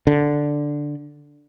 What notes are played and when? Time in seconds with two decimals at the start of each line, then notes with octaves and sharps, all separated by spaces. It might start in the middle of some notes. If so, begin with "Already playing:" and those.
0.07 D3